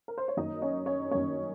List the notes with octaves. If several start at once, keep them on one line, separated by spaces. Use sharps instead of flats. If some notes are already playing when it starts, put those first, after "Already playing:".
A#4
C5
C#5
F#2 D#3 A#3 D#4 D#5
C#4 C#5
C#4 C#5
F#2 D#3 A#3 C#4 C#5